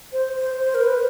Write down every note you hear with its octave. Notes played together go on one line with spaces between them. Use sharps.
C5
C5
C5
A#4
B4